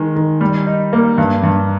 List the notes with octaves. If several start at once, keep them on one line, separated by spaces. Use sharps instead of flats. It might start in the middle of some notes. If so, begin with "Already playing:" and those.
Already playing: D#3 G#3
D#3
G3
D#4
A#3
G2
G2